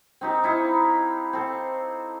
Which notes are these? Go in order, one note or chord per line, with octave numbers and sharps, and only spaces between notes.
C4 D#4 G4
D#4 E4 F5
C4 A4